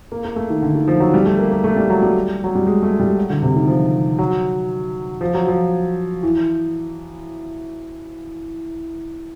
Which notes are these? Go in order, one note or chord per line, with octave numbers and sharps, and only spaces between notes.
A#3
A#3
A3
D#3
D3
D#3
F3
F#3
G3
A3
A#3
A#3
A3
G3
F#3
G3
F#3
G3
G#3
A3
G3
F#3
D3
C3
D#3
F3
F#3
F3
F#3
F3
E3